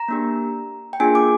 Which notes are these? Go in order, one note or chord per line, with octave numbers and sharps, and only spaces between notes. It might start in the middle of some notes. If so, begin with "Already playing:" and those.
Already playing: A#5
A#3 D4 G4
G5
A#3 D4 F4 G#4 G#5
D6